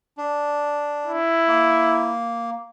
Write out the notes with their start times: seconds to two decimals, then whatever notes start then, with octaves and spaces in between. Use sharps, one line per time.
0.17 D4
1.06 E4
1.48 A#3